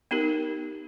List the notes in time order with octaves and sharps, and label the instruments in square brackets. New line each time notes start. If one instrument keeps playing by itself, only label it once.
[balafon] B3 D#4 G4 A#4